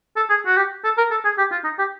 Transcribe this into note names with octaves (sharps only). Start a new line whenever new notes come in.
A4
G#4
F#4
G4
A4
A#4
A4
G#4
G4
F4
D#4
G4